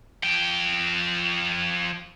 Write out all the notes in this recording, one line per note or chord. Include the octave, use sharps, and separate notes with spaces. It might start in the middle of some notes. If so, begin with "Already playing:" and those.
F3 G5